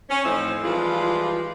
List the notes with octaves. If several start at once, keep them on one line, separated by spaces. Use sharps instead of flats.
C#4
A2 E3 F3 C4 D#4 E4
E3 F3 G3 G#3 F4